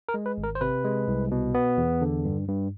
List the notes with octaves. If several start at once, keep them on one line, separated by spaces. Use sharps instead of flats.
A#4
G#3
B4
G#1
A#4
C5
C3 B4
G#3
C2
B2
B3
E2
D3
G2
G2